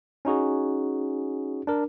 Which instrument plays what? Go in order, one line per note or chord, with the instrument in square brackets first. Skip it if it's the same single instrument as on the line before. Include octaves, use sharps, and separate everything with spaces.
[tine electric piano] C#4 D#4 F#4 G#4
D4 A#4